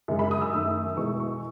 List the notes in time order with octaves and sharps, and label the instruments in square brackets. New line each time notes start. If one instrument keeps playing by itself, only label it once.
[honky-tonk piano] F#2 C#3 G#3
B5
D#6
E6
F#2 D#3 A3 D#6
E2 B2 G#3 C#6
C#6